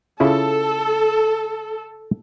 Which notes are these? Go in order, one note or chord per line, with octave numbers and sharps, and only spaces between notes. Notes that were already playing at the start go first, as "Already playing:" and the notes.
C#3 E4 F4 A4